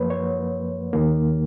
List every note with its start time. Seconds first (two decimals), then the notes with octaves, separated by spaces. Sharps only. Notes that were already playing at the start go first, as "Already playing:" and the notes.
Already playing: F#2 F3 A#3 B4 C#5
0.10 C#5
0.93 D#2 D#3 A#3